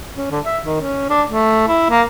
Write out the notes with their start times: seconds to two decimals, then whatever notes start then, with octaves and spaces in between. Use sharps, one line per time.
0.16 C#4
0.31 D3
0.45 E5
0.65 D#3
0.81 C#4
1.10 D4
1.28 A3
1.68 E4
1.90 A#3